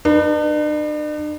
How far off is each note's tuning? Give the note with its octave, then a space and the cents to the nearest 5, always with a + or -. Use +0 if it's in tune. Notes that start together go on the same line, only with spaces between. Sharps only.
D4 +45 B4 -20